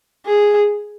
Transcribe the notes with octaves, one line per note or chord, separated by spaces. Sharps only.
G#4